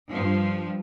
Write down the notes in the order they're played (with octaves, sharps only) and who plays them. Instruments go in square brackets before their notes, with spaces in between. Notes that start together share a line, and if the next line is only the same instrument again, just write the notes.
[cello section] G2 F3